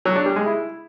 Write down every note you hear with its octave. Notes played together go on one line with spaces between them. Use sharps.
F#3
D4
G3
G#3
E4